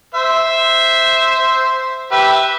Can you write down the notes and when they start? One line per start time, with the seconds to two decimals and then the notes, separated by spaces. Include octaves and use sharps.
0.15 C5 E5
2.12 G4 B4 E5